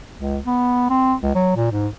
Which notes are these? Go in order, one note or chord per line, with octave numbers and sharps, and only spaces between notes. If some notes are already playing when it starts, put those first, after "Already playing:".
C#2
B3
C4
C#2
F#3
A#2
G#2